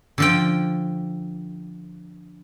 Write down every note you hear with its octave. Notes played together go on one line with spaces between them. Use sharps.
D3 F3 G5